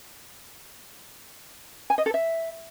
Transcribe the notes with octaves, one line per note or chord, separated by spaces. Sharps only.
G#5
D#5
A4
E5